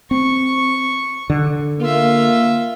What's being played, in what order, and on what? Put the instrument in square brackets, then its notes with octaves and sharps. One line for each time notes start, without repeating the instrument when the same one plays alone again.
[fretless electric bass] C4 [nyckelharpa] C#6
[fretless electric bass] D3
[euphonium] A#3 [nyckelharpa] F4 E5